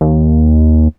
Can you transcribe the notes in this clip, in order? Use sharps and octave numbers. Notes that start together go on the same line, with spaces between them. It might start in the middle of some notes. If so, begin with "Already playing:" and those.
D#2